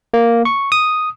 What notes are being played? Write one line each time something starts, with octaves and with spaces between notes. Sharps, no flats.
A#3
C#6
D#6